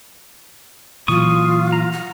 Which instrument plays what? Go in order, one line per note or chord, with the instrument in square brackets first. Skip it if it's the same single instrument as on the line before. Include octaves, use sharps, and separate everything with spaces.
[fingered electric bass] A#2 E3 F#3 [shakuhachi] F4 [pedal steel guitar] C#6 D#6
[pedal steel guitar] A#5
[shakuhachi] F#5